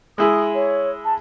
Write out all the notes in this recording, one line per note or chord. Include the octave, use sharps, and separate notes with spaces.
G#3 E4 G#4 D#6
C#5
A5